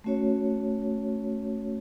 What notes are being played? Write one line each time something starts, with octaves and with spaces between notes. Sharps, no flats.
A3 C#4 F#4 C#5